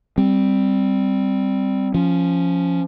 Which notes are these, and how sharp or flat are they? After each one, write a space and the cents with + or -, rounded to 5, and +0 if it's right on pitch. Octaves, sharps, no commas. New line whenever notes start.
G3 +0 C4 +0
F3 -5 C#4 +0